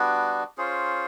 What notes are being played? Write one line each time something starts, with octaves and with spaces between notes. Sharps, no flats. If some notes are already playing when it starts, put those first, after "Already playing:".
Already playing: G3 B3 D4 F#4
C#4 F4 G#4 C5